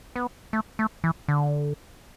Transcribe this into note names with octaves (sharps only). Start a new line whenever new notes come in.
B3
A3
A3
E3
D3